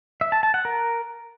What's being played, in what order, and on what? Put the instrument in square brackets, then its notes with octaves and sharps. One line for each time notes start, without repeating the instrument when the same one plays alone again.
[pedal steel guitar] E5
A5
A5
F#5
A#4